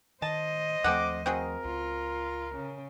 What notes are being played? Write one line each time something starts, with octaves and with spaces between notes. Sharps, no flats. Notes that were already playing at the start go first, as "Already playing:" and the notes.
D#3 C5 D#5 A5
D#2 F3 A3 C4 A4 F#5 D6
C4 F#4 G#4 A#4
C#2 F4
C#3